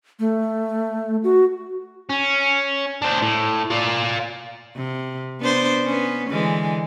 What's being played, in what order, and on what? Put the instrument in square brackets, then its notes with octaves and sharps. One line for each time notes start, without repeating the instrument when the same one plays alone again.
[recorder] A3
F#4
[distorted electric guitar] C#4
D4 C5
A2
F4 D5
[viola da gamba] C3
B3 D4 C5
B3 C#4
D3 E3 G#3